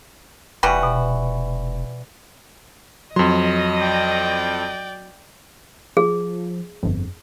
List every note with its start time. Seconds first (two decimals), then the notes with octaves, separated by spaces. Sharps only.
0.63 F1 E3 G3 F#4
0.83 B2
3.16 F2 F#3 D#5 C6
3.80 D5 G5
5.97 F3 G#4
6.83 G1 F2